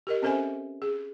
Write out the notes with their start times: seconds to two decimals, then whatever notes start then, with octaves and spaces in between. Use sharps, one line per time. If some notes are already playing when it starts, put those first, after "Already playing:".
0.07 G4 A#4 D#5
0.22 C4 C#4 A4 C5 E5 G#5
0.82 G#4